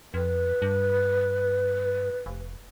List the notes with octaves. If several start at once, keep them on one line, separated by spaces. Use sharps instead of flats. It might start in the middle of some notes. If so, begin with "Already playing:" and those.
F2 B4
G2
F1